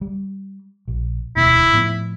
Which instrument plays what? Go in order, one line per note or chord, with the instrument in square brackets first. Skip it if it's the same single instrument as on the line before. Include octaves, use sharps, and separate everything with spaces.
[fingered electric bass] G3
A#1
[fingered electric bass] E1 D2 B2 [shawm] E4
[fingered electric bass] A2 F3 B3